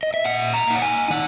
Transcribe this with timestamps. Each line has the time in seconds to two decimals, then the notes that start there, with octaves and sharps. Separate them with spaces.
0.03 D#5
0.14 E5
0.24 A#2 F#5
0.54 A#5
0.67 A#3 D#4
0.76 F#5
0.82 G#5
1.10 D#3 F#5